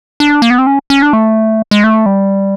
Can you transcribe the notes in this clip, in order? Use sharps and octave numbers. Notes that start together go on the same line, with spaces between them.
D4
A#3
B3
C4
C#4
C#4
D4
A3
G#3
A3
G3